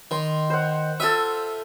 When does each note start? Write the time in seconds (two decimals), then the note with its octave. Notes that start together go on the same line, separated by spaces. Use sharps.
0.11 D#3 C6
0.50 C5 F#5
1.00 F4 A4 E5 D#6